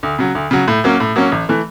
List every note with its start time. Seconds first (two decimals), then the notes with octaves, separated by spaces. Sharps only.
0.03 D2
0.19 C#3 F#3
0.35 D2
0.51 C#3 F#3
0.68 A2
0.84 F#3 A#3 C#4
1.00 A2
1.16 F#3 A#3 C#4
1.32 A1
1.49 E3 A3